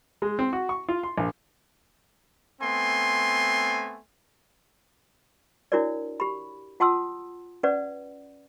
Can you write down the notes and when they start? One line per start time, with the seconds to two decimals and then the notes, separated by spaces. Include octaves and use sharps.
0.22 G#3
0.39 C4
0.53 F#4
0.69 C#6
0.89 F4
1.03 C6
1.18 A#1
2.61 A3 B3 C4 G#5 C6
5.72 D4 E4 F#4 A#4 C#5 D5
6.20 G4 B5
6.80 F4 F#5 A5 C6 D#6 E6
7.63 C#4 B4 D5 F#5